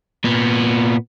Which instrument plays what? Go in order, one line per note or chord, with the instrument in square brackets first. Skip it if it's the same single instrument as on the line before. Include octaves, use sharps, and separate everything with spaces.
[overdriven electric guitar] A#2 B3